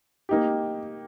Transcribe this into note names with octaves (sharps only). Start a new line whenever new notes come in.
A#3 D#4 G4